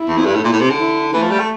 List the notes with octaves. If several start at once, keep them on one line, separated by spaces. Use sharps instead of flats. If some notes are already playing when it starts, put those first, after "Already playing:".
Already playing: E4
E2
F2
G2
A2
A#2
A2
C3
D3
E4
E3 A3
F3
G3
A3